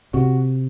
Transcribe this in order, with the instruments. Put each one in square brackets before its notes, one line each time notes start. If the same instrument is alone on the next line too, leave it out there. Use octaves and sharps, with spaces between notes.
[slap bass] C3 [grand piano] F#4